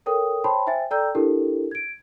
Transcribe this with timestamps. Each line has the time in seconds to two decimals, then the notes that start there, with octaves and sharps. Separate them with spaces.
0.06 A4 A#4 C#5 G5 D#6
0.44 C5 C#5 G5 A5 B5 C6
0.67 C5 E5 G5 G#5 A6
0.91 A4 D5 G5 A#5 E6 G6
1.15 D4 E4 G4 A4 A#4
1.71 G#6 D7